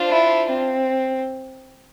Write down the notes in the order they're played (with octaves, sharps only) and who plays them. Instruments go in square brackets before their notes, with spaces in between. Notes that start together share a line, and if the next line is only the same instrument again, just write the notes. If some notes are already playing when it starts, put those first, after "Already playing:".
Already playing: [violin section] D4 F4 C5
[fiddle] E4
C4